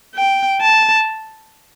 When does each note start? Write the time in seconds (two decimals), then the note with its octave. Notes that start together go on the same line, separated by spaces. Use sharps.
0.15 G5
0.61 A5